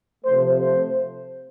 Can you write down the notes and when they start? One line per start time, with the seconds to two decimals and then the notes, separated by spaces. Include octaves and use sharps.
0.24 C3 F3 A3 C5
0.59 C5